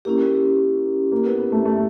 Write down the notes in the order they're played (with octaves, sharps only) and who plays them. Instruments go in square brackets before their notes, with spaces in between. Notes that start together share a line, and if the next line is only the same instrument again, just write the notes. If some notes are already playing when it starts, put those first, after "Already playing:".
[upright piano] A#3 [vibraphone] C#4 E4 G4
[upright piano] A#3
B3
B3
A3
A3